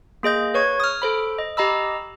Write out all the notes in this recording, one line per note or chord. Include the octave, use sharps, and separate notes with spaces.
A#3 G#4 D#5 G6
B4 C#5 C#6 G#6
D#6 F6
A4 C5 B5
D#5
G4 D#5 A#5 B5 E6